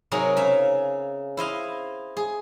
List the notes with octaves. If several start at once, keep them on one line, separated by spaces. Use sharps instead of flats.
C3 F#3 D#4 G#4 A#4 A#5
C#3 E5 F5
E4 C5 D#5 F5
G#4